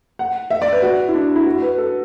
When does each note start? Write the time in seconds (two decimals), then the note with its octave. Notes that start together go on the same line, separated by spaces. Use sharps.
0.19 F#5
0.50 E5
0.62 D5
0.73 B4
0.82 F#4
1.08 E4
1.14 D4
1.36 E4
1.46 F#4
1.62 B4
1.78 A4